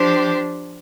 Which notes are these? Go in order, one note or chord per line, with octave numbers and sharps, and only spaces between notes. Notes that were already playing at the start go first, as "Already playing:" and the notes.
Already playing: F3 D4 G4 C5